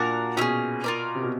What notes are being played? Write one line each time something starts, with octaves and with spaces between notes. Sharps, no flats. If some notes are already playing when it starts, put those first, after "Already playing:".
Already playing: A#2 D4 F#4 A#4
B2 C#4 E4 G#4
F4 A#4 D5
C3
B2